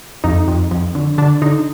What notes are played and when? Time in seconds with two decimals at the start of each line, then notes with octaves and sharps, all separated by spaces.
0.24 F2 D#4
0.48 F2
0.71 F2
0.95 D3
1.18 D3 D4
1.42 D3 D#4